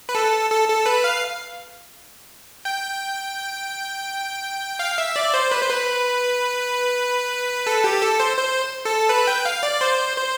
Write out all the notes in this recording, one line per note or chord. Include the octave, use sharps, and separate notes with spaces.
B4
A4
A4
A4
B4
F5
G5
F5
E5
D5
C5
B4
C5
B4
A4
G4
A4
C5
C5
A4
B4
G5
F5
D5
C5
C5